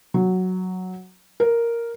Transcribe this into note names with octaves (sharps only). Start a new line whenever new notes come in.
F#3
A#4